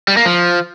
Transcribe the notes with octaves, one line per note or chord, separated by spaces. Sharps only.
G3
A#3
F3